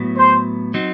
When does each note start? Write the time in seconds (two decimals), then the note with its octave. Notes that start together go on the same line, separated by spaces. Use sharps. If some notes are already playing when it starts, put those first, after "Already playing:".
Already playing: A2 F#3 B3
0.18 C5
0.74 F#3 C4 D#4